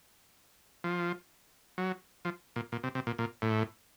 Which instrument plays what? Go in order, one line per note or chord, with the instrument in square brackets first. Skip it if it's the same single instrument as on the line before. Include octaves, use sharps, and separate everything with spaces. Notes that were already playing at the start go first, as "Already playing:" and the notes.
[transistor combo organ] F3
F#3
F3
A#2
A#2
C3
C3
A#2
A#2
A2